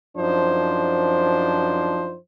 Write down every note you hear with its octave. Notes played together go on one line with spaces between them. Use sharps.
F#2 F3 D4 D#4 C5